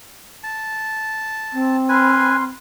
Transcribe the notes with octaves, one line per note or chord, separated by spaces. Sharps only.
A5
C4
B4 G#5 B5 C6 F6